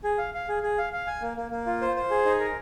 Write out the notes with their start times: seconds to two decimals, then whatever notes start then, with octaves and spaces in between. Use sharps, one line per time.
0.04 G#4
0.18 F5
0.34 F5
0.49 G#4
0.63 G#4
0.78 F5
0.93 F5
1.07 G#5
1.21 A#3
1.37 A#3
1.51 A#3
1.66 F4
1.82 C5
1.96 C5
2.11 G#4
2.26 D#4
2.40 A#4